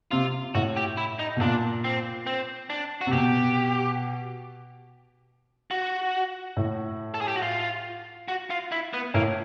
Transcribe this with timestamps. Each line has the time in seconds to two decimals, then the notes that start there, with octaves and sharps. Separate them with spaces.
0.11 C3 F4
0.55 A2 F#4
0.77 G4
0.97 E4
1.19 D#4
1.36 B2
1.41 A#2 D4
1.84 C4
2.27 C4
2.70 D4
3.01 F#4
3.06 C3
3.12 B2 G4
5.71 F#4
6.57 A2
7.14 A4
7.21 G#4
7.28 G4
7.36 F#4
7.42 F4
8.28 F#4
8.50 F4
8.72 E4
8.94 B3
9.14 A2 A#3